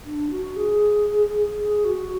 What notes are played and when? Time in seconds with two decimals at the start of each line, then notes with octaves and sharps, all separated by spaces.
0.05 D4
0.30 F#4
0.56 G#4
1.58 G#4
1.84 F#4